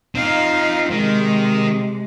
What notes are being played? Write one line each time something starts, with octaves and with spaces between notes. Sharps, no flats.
C4 D#4 F4 F5
C3 D#3 G#3